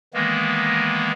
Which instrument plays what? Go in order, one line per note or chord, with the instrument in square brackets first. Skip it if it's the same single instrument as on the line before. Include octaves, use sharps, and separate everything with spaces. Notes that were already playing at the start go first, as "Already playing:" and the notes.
[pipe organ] D#3 E3 G#3 A#3 B3